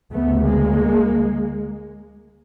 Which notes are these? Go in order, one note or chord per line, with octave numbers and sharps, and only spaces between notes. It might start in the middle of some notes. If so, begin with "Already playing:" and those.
D2 C#3 A3 B3
G#3 A#3